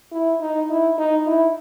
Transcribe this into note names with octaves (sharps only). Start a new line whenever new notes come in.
E4
D#4
E4
D#4
E4